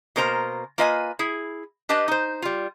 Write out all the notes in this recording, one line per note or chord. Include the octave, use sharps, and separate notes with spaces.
B2 A#3 A#4 C5 A#5
A#3 F4 B4 D#5 F5 G#5
E4 G#4
D4 G4 B4 D#5 A5
D#4 C5
G3 F4